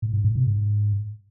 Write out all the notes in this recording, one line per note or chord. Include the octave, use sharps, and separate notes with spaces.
A2
G#2
A2
C3
G#2